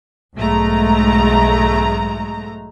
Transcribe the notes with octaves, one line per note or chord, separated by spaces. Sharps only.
B1 G#2 G#3 A3 A#5